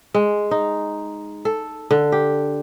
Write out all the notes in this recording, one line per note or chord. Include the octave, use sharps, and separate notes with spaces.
G#3
D#4
A4
D3
G4